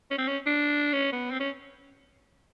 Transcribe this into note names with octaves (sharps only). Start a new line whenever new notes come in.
C#4
C4
C#4
D4
C#4
B3
C4
C#4